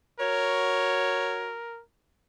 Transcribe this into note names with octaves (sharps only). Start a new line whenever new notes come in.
F#4 A#4 C#5